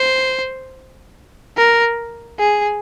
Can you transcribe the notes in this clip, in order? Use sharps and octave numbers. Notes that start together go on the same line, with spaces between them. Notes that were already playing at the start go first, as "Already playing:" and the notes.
Already playing: C5
A#4
G#4